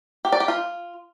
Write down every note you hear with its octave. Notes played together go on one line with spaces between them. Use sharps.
G4
D5
G4
F4